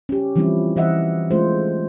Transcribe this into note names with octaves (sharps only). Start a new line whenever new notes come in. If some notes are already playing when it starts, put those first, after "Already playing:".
C#4 G4
E3 F3 G3 C4 C#4 E4
E3 D#5 E5 F#5
G#3 A3 C#4 F4 C5